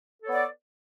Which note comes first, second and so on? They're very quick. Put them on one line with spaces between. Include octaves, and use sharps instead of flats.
A4 C#5 B3 D5